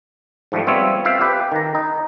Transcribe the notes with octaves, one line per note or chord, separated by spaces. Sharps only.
G#2 F3 G3 A3
G3 B3 C4 F4 C#5 E5
C4 F4 C5 E5 F5
G4 B4
D#3 A#5
D#4